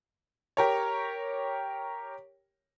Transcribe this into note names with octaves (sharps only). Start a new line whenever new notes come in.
G4 A#4 C#5